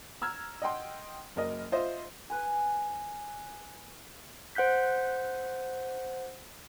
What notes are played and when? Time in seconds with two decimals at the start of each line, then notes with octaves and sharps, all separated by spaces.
0.21 A#5 E6 F6 G#6
0.62 D#5 F#5 G5 C6
1.36 F#1 A#4 D#5
1.72 F4 C5 D#5 E5
2.30 B4 G#5
4.55 C5 F#5 F#6 G6 B6